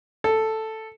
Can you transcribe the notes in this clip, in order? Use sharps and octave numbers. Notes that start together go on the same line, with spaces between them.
A4